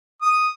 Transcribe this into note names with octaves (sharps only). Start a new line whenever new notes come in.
D#6